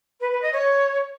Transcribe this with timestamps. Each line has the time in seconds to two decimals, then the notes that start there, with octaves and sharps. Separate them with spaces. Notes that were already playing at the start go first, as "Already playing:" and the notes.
0.20 B4
0.31 B4
0.42 D#5
0.52 C#5